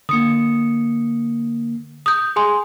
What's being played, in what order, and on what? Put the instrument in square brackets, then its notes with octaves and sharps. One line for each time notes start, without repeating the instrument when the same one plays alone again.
[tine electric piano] D3 A#3 [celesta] D#6 C#7
[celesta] D#6 G6
G#4 G#5 C6